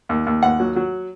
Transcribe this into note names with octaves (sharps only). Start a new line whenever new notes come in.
D#2
D#2
D#2 F#5
F#3
F#3